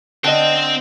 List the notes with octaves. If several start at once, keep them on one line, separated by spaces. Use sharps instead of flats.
D3 C5 D#5 G5